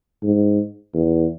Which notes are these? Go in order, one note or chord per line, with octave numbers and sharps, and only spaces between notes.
G#2
E2